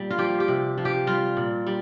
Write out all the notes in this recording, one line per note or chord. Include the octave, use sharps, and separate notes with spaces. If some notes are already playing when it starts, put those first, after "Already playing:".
Already playing: A#2 G3
F4
F3 G4
G4
C3
F3
G4
G3 F4
A#2
G3